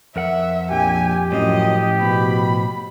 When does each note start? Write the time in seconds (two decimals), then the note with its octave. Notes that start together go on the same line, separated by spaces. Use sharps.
0.16 F2 A#4 E5 F#5
0.71 A#1 G4 G#5
1.32 F#2 A2 F3 D#5
2.01 B2 B5